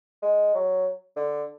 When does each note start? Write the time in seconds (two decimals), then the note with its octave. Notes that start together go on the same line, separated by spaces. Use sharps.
0.23 G#3
0.55 F#3
1.16 D3